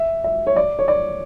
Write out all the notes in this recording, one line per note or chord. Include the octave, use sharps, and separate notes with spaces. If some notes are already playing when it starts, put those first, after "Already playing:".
Already playing: E5
E5
C#5
D5
C#5
D5